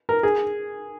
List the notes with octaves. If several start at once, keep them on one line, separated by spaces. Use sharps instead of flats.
A#4
G#4